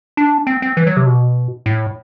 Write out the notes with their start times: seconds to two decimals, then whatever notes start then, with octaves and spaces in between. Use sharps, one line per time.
0.17 D4
0.47 C4
0.62 C4
0.77 E3
0.87 F#3
0.97 C3
1.06 B2
1.66 A2